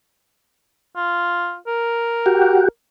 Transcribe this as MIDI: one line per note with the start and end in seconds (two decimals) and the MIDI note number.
0.96 1.57 65
1.67 2.66 70
2.26 2.68 66
2.26 2.68 67